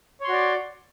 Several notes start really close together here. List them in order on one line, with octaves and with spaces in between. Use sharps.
C#5 C6 F#4 D5